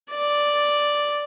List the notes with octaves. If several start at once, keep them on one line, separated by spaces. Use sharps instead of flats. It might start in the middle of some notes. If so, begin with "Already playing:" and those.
D5